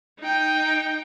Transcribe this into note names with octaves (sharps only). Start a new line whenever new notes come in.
D#4 G5